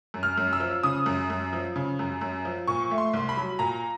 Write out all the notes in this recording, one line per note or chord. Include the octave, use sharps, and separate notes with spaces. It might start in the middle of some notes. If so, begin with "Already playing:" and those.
F#2
F6
F#2
E6
F3
C#3 D#6
F#2
F#2
F3
C#3
F#2
F#2
F3
A#2 C#6
A3
C6
C2
B5
F#3
A#2 A#5